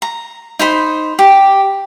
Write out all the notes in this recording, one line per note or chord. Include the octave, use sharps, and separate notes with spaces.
A#5
D#4 C5 B5
G4